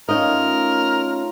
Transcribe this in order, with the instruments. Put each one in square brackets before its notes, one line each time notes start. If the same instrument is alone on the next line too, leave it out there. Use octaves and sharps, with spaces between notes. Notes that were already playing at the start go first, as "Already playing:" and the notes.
[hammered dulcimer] A3 F4 [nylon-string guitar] C#4 D#4 D#5 [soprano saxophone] A#4